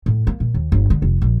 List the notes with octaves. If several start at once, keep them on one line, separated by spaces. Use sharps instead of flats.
A2
A#3
A#2
D#2
G1
D3
F1
A#1